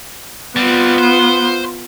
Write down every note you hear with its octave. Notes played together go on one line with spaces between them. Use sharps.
G3 B3 C4 F4
C5